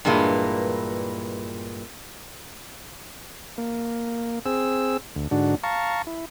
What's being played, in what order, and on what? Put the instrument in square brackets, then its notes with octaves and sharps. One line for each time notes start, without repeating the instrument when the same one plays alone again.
[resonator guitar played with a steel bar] G2 A#2 E3 G#3 A#3
[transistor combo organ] A#3
C4 G#4 E6
D2
G#2 D3 D4 F#4
F5 A5 A#5 C#6
E4